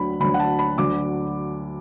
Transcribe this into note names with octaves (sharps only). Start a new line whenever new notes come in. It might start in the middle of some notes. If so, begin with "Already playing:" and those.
Already playing: D2 D3 F#3 B5
D2 D3 F#3 B5
F#5
A5
B5
D2 D3 F#3 D6